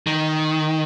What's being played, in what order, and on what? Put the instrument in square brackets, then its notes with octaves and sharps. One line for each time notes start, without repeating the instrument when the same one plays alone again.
[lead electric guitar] D#3